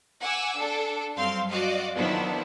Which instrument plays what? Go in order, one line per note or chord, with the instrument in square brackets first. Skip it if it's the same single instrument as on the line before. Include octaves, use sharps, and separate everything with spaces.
[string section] F#5 G#5 D6 E6
D4 A4
G2 F#3 C4 F5 C6 F6
F#4 D5 D#5 F5
D#3 F3 F#3 B3 D4 E4